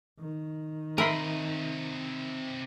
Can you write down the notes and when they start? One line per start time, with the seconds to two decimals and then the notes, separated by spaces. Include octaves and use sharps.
0.19 D#3
0.98 C3 A#4 D#5 E5 B5 C6